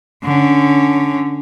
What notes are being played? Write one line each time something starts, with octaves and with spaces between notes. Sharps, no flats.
D3 C#4